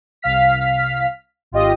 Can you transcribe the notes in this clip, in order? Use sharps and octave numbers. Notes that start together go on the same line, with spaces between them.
C2 F5 F6 B6
G#1 F4 G4 D#5